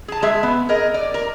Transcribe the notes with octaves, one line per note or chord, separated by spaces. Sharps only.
G#4 A5
G#3 G#4 E5
B3
G#4 A#4 D#5
D5
A#4